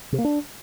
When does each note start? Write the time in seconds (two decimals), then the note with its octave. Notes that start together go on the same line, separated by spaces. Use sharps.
0.12 C3
0.18 A#3
0.25 D4